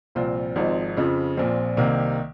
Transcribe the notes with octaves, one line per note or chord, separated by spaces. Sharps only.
C2 A#2 F3 C4 F4
G#1 G#2 F3 C4 D#4
F2 C#3 F3
A#1 A#2 F3 C4
C2 C3 D#3 A#3